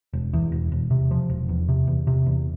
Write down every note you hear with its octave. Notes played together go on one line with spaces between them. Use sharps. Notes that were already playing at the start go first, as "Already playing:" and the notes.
E1
E2
E1
E1
C3
F3
E1
E2
C3
E2
C3
E2